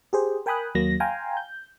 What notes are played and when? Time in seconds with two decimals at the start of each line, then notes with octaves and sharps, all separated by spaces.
0.13 G4 G#4 C5
0.46 A#4 G5 G#5 B5 D#6 F#6
0.75 D#2 F#3 A#3 A#6
1.00 F5 G5 G#5 A#5 C6
1.37 G6